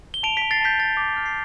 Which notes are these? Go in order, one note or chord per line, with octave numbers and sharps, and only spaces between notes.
G7
A5 D7 F7
A5 B6 D7
A6 C7
A5 G6 B6
A5 A6
D6
F6
C7